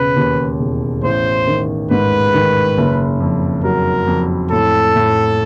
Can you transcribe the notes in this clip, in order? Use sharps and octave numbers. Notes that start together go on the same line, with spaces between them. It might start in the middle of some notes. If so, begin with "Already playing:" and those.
Already playing: E1 C#3 B4
D#2
E1
A1 C5
D#3
G#2 B4
D#3
F#1
F2
F#3 A#4
F2
A2 A4
A2